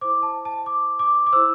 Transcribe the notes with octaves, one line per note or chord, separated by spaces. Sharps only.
E4 C5 D6
A5
A5
D6
D6
D6
E4 C5 E6